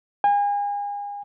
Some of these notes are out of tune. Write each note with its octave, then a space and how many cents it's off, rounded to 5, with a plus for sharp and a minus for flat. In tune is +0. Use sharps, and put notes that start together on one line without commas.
G#5 -35